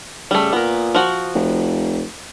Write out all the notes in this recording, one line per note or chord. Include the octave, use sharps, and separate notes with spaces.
C#3 G3 A3
A#2 B3 A#4
F3 F#4
F1